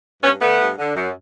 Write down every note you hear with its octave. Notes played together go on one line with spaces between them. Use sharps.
G2 B3 C#4
D3 A3 B3
G2
D3
F#2